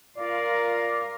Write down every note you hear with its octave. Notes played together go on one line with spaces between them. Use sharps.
F4 A#4 D5 F5